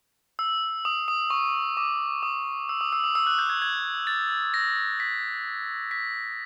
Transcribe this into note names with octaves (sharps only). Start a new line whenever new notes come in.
E6
D#6
D#6
C#6
D6
D#6
E6
D#6
E6
D#6
E6
F#6
G6
G#6
G#6
A6
A#6
B6
B6